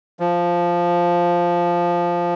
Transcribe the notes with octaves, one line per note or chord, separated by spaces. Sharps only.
F3